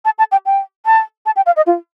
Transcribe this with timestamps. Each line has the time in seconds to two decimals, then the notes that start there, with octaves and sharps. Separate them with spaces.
0.05 A5
0.18 A5
0.32 G5
0.46 G5
0.86 A5
1.26 A5
1.36 G5
1.46 F5
1.56 D#5
1.67 F4